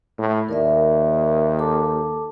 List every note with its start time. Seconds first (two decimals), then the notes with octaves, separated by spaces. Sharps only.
0.19 A2
0.49 D#2 A#4 D5 E5
1.59 A4 A5 D6